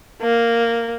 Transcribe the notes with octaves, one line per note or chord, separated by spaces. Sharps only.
A#3